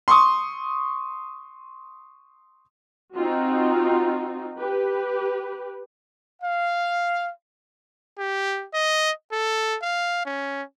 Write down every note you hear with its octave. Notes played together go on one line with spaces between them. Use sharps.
C6 C#6 D#6
C4 D#4 F4 F#4
G4 B4
F5
G4
D#5
A4
F5
C#4